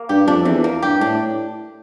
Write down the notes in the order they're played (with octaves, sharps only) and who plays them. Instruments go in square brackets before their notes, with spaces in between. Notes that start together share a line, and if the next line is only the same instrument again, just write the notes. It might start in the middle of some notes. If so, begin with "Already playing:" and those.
Already playing: [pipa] A#3
[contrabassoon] G2 [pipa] G4
[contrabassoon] F2 [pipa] D4
[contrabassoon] E2 [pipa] E3
[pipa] A#3
[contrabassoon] G2 [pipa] G4
[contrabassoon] A2 [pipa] D4